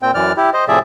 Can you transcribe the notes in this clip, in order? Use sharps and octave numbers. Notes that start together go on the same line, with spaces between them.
A#2 C4 G5
F#2 E3 D5 F6
E4 G4
C5 D#5
A2 C3 F3 G#4 D5 E5